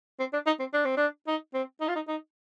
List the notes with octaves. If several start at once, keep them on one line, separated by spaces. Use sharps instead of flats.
C4
D4
D#4
C4
D4
C4
D4
D#4
C4
D#4
F4
D#4
D#4